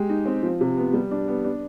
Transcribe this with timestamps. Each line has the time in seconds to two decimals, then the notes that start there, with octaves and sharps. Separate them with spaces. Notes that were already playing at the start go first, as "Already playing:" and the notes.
Already playing: G#3 G4
0.09 D#4
0.26 C4
0.43 F3
0.61 C3
0.77 B3
0.93 G3
1.11 D4
1.28 B3
1.44 D4